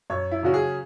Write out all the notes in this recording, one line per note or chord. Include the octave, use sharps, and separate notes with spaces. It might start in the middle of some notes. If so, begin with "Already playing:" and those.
F#2 C#5
E4
C#3 F#3 C#4 F#4
G#4